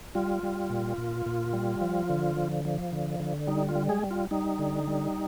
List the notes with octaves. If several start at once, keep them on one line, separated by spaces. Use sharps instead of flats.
G3 F4
G3
A#2
A#2
A#2
G3
F3
D3
F3
F3
D3
D3
G3 D#4
F4
G3
G#3 G#4
G3
F4
G3 D#4
D3
G3